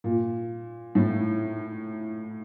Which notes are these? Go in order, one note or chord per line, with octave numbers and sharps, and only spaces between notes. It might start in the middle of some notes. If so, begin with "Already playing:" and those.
A#2
A2